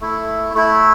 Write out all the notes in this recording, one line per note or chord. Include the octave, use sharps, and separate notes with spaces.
A3 E4
A3 E4